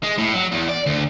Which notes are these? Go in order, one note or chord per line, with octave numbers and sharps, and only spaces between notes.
G#3
A2
F#3
E2
D5
D2